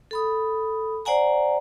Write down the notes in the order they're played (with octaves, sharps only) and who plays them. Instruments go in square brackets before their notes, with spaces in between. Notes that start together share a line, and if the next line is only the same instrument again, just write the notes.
[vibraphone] A4 B5 D#6
C5 D5 F#5 G#5 A#5